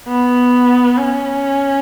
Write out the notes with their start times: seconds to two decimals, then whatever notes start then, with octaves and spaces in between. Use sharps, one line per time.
0.08 B3
0.97 C#4